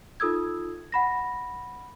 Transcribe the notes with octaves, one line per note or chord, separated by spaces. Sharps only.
D#4 F4 A4 D#6 E6 G#6
F#5 B5 A#6